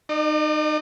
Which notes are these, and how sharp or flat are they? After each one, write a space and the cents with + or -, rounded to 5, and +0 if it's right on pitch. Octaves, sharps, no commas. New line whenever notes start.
D#4 -25 D5 +40